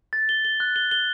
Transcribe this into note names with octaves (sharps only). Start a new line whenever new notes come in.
A6
G7
G7
F#6
G7
G7